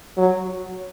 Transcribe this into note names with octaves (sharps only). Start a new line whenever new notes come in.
F#3